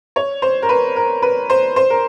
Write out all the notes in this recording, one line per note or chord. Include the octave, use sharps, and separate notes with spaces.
C#5
C5
A#4
B4
A#4
B4
C5
C5
A#4